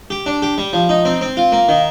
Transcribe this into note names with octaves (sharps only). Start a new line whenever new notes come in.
G4
D4
G4
G3
F3
D#4
C4
C4
F4
A#3
D#3